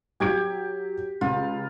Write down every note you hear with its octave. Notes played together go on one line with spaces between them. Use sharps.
F#3 G4 G#6 D7
C#2 F4